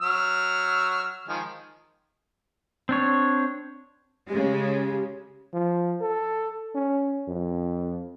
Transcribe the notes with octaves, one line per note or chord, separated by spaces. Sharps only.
F#3 E6 F6
D#3 F3 G#3
C4 D4 C#5
C#3 G#3 G4
F3
A4
C#4
F2